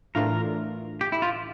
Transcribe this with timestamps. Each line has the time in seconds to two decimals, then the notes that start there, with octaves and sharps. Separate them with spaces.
0.15 A2 E3 A3 D4 F4 A#4
1.01 G4
1.12 E4
1.22 F4